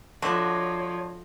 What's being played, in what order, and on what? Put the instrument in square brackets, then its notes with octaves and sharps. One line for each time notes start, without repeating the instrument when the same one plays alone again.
[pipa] D3 [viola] F3 [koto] F#4 D#5 E5 [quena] C#5